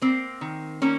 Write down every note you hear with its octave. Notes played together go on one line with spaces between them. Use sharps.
A#3 C4
D#3
A#3 C#4